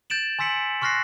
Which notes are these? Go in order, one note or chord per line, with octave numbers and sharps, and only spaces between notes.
G6 A6 D7 E7 F#7
G#5 C6 E6 B6 C#7 F#7
C6 C#6 F6 F#6 A#6 C7